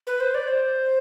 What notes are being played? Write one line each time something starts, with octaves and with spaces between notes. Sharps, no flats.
B4
C5
D5
C5